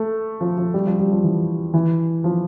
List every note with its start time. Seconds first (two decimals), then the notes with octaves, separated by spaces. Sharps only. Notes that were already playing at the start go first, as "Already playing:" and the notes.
Already playing: A3
0.41 F3
0.58 F3
0.74 G3
0.86 F3
0.99 G3
1.12 F3
1.24 E3
1.74 E3
2.24 F3